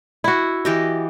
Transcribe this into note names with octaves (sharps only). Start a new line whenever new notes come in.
E4 F#4
E3 G4 D#5